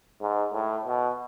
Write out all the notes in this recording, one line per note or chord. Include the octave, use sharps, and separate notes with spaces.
G#2
A2
B2